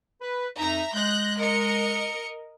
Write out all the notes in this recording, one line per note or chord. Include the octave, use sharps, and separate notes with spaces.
B4
F2 D#4 E5 A#5
G#3 F#6 G6 A#6
A#4 D#5 C#7